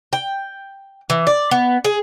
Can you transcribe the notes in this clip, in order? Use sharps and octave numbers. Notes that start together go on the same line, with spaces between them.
G5
E3
D5
B3
G#4